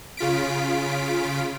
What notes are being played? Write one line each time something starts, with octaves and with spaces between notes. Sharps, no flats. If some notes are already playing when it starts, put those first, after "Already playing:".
C#3 F4 B6 D7